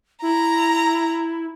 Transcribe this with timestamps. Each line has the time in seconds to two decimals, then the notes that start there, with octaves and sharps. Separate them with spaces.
0.22 E4 A#5